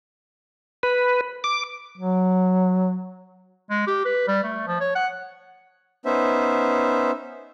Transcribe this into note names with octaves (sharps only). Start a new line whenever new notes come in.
B4
D6
F#3
G#3
G4
B4
G3
A3
F3
C#5
F#5
B3 C#4 D#4 C5 E5